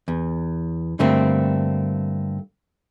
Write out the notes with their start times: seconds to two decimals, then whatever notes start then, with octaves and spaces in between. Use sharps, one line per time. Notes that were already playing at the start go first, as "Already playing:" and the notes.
0.08 E2
0.99 G2 D3 A3 A#3 C4